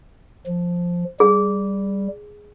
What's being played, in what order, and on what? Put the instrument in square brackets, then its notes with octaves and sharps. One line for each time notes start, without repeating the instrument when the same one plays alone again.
[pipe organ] F3
[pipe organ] G3 [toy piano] G#4